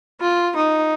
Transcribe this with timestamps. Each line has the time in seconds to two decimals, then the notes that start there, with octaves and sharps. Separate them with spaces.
0.20 F4
0.56 D#4